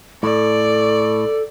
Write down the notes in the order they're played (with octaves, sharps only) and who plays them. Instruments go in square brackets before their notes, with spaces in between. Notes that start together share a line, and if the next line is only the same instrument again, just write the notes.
[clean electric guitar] A2 [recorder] A4 [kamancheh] D5